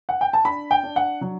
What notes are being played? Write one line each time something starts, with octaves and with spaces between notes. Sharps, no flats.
F#5
G5
A5
D4 B5
G5
D4
F#5
F#3